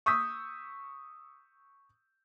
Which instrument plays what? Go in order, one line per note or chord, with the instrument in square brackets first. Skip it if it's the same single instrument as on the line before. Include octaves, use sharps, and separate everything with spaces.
[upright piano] C#6 D#6 E6 G6 B6